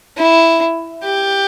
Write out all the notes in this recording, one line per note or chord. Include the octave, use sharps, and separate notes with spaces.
E4
G4